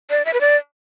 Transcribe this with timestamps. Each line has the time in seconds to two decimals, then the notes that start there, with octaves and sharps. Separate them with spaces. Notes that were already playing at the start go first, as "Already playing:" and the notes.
0.10 D5
0.25 E5
0.33 B4
0.41 D5